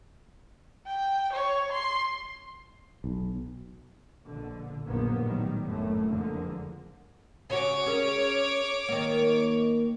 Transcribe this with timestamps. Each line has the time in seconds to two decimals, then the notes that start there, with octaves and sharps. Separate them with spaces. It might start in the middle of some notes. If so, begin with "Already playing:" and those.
0.87 G5
1.33 C#5
1.72 C6
3.04 B1
4.27 A#1 B2 D3
4.85 A#1 F#2 D#3 F3 A#3 B3
5.21 A2 D#3 F#3 G3
5.65 G1 F#2 A2 A3 A#3
6.09 F#1 F2 D3 F3 G#3 A#3
7.50 C#3 F#4 C#5 D6
7.86 C#4 G#4 A#4
8.88 D#3 A#3